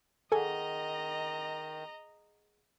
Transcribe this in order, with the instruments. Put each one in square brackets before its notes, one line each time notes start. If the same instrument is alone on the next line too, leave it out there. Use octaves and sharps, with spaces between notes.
[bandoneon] D#3 [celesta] G#4 F#5 [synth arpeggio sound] A4 G#5 [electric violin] D#5 A#5